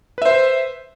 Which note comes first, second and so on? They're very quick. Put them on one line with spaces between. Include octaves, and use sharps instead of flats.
B4 E5 C5